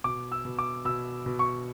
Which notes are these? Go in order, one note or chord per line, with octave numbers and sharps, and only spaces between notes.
B2 D6
E6
B2
D6
B2 E6
B2
C#6